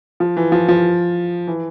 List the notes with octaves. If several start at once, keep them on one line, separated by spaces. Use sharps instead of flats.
F3
E3
F3
F3
E3